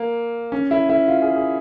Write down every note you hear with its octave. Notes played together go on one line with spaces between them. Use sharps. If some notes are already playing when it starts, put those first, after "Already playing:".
Already playing: A#3
C#4
E4
E4
F4
G#4
G#4